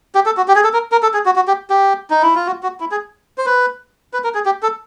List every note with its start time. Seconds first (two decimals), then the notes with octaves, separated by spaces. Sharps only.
0.15 G4
0.26 A4
0.37 F#4
0.48 G4
0.56 G#4
0.64 A4
0.73 A#4
0.92 A#4
1.03 A4
1.14 G#4
1.26 F#4
1.36 F#4
1.48 G4
1.70 G4
2.10 D#4
2.22 E4
2.35 F4
2.47 F#4
2.63 F#4
2.80 E4
2.91 G#4
3.38 C5
3.46 B4
4.13 B4
4.24 A#4
4.34 G#4
4.46 G4
4.63 A4